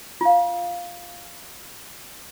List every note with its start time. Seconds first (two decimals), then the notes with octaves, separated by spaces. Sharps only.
0.21 F4 F5